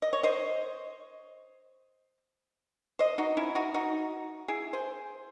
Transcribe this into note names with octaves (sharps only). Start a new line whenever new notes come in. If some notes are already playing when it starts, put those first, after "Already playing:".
D#5
C#5
C5 D#5
C5 D#5
D#4 F#4
C#4 E4
D#4 F#4
D#4 F#4
E4 G#4
G#4 C5